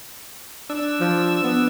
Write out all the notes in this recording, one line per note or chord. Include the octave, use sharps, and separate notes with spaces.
D4 E6
F3
B3